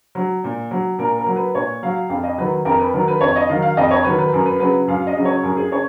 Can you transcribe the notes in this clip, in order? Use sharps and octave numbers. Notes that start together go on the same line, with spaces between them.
F#3
A#2
F#3
A#2 A#4
A#4
F#3
B4
A#2 C#5
F#3 F5
F2 F5
D#5
D#3 F#3 B4
F2 A#4
B4
D#3 F#3 A#4
B4
F2 C#5
D#5
D#3 F#3 F5
F5
F2 D#5
C#5
D#3 F#3 B4
B4
F#2 A#4
B4
C#3 F#3 B4
F#2 F5
D#5
C#3 F#3
C#5
F#2 A#4
G#4
C#3 C#5